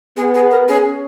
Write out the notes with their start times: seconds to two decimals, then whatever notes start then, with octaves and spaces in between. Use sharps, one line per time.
0.17 B3 G#4
0.34 G#4
0.51 A#4
0.68 C#4 G#4